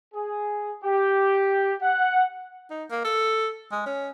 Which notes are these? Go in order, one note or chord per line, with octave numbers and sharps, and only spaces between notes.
G#4
G4
F#5
D#4
A#3
A4
G#3
C#4